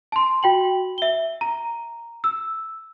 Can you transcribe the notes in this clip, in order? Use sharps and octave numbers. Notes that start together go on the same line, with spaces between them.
A5 C6
F#4 G5 F#7
E5 G7
A#5
E6